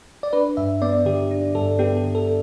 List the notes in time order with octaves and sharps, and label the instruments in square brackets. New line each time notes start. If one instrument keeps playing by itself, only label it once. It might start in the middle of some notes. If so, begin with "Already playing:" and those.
[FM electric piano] D5
D4 B4
G2 E5
B3 D5
D3 G4
D4
G2 A4
B3 G4
G4
D3
A4